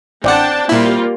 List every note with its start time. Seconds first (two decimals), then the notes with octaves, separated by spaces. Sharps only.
0.24 A1 C4 D4 D5 F#5 G5 A5
0.69 A#2 G3 A#3 E4 F4